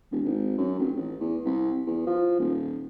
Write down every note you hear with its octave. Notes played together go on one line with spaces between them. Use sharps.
E1
G#1
F#2
F1
A1
E2
C2
E2
F3
D#1